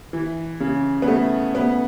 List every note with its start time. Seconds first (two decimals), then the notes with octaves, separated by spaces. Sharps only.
0.13 E3
0.60 C#3
1.02 B3
1.08 A3
1.55 B3